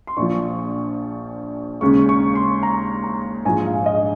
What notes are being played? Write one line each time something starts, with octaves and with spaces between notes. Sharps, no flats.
C6
A#1 A#2 F3 C#6
D#2 C#3 G#3 C#6
C#6
C6
A#5
A#5
A#1 G#2 F3 G#3 G#5
F5
D#5